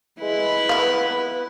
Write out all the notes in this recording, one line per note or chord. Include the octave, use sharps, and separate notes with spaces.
G#3 E4 B4
B3 E5 F5